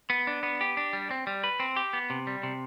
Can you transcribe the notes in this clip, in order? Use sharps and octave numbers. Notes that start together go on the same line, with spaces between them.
B3
D4
B3
G4
D4
G3
C4
G3
B4
C4
G4
B3
C3
G3
C3